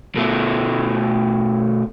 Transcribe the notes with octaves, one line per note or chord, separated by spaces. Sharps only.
B2 A3